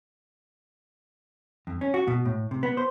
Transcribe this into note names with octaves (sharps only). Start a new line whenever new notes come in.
F2
C#4
F#4
B2
A2
C3
B3
C5